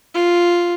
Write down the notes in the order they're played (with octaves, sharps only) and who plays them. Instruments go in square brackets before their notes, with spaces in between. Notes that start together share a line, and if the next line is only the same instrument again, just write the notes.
[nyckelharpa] F4